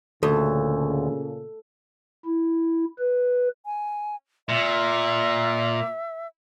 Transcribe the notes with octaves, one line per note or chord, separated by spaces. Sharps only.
D2 A#2 C#3 A4
E4
B4
G#5
A#2 E5